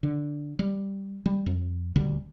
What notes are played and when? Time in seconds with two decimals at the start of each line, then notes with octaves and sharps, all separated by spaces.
0.03 D3
0.59 G3
1.26 G3
1.46 F2
1.96 D#1 D2 D3 G3